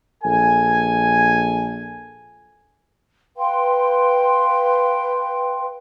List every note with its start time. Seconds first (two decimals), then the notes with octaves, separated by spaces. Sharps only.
0.24 A#1 A4 G#5
3.37 B4 F5 G5 C6